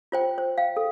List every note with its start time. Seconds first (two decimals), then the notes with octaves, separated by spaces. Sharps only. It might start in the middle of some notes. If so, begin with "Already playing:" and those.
0.12 F4 C5 G5
0.38 C5
0.58 F5 G5
0.77 A4